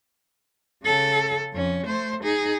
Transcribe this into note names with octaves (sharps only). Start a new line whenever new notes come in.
C#3 A4
F2 C#4
A3 C5
D#4 G#4